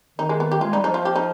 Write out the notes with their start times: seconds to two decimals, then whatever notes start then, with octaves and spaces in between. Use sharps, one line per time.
0.18 D#3 D#4
0.29 G#3
0.40 B3
0.51 G4
0.60 G#3 F4
0.72 G3 D#4
0.84 F3 D#4
0.94 F4
1.05 G4
1.16 D#4